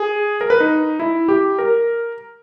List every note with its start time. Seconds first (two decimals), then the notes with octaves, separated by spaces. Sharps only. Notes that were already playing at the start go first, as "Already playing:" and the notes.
Already playing: G#4
0.41 A#4
0.50 B4
0.60 D#4
1.00 E4
1.28 G4
1.59 A#4